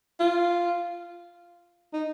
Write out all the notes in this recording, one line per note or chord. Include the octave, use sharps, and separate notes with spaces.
F4
D#4